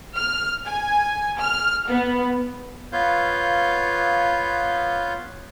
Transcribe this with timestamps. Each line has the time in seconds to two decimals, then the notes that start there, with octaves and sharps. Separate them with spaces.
0.16 F6
0.65 G#5
1.38 F6
1.87 B3
2.92 B3 F4 B4 C#5 F5 G6